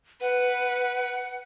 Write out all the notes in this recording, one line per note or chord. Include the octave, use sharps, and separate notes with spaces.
B4 F#5